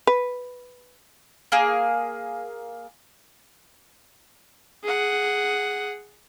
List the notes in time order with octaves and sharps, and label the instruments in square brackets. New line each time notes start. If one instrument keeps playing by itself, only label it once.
[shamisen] B4
[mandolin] A#3 G#4
[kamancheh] G#4 F#5